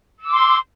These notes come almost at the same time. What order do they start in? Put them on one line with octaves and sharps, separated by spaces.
E6 D6 C6